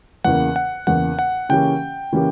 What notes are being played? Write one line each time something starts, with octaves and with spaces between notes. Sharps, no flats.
E2 C#3 E3 A#3 F#5
F#5
E2 C#3 E3 A#3 F#5
F#5
C#3 E3 A#3 C#4 G4 G5
C#3 E3 A#3 C#4 G4